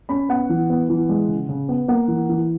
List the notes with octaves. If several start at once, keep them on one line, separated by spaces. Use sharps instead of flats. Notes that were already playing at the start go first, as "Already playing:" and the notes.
C#4 B5
B3 F#5
E3
B3
E3
G#3
C#3
C#3
B3
A#3 F#5
E3
E3